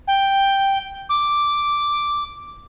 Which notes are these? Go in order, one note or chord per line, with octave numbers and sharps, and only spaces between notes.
G5
D6